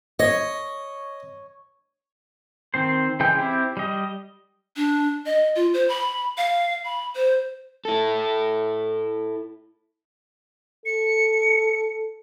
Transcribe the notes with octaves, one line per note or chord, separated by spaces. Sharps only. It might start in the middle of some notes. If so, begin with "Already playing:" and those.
C#5 D#5
D#3 C4 C5
C#3 E3 G#3 G5
C4 E4 G4
G3 D#5
D4
D#5
F4
C5
B5
F5
B5
C5
E4 A4
A4 C#7